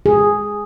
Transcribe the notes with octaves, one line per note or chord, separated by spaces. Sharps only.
G#4